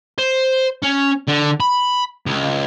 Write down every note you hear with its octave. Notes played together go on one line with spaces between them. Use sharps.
C5
C#4
D3
B5
C#2